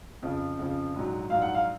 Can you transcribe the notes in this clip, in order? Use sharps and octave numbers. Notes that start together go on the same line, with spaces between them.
F2 C#3 F3
F2 C#3 F3
A#1 G#2 F#3
A#1 G#2 F#3 F5
F#5
F5